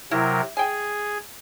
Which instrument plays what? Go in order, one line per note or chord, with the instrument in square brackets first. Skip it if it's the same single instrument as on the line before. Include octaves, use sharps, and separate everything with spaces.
[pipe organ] C3 F#3 A#4 [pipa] E4
[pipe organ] G#4 [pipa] G5 G#5